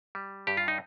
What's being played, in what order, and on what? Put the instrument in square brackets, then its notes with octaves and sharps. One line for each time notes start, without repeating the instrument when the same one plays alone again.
[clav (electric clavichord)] G3
G2 G4
F4
D#4